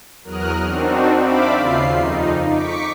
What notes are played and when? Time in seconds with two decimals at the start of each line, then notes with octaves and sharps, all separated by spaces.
0.24 E2 F#3 A#4 D#6 F6 F#6
0.65 C4 D4 D#4 F#4
1.17 C5 D5 E5 F5 B5 D6
1.56 D#2 C#3 F4 C7
1.93 F2 D#4
2.51 C#6 D6 B6 C#7